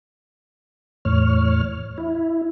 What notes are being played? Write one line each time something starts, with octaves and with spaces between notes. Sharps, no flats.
E2 A2 C#5 F6
E4